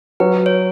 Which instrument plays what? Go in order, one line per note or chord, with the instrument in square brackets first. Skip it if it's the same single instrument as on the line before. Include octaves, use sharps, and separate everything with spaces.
[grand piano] F#3 [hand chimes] B4
[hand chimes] C#5